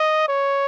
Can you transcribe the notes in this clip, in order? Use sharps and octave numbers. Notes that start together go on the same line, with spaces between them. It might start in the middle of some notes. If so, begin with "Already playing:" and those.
Already playing: D#5
C#5